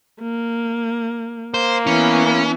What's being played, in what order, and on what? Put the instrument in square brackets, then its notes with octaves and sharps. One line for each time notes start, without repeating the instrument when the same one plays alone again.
[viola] A#3
[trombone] A#3 [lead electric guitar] C5
[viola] E3 B3 [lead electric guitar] C#4